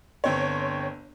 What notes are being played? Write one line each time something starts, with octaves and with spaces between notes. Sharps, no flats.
G1 C4 C#5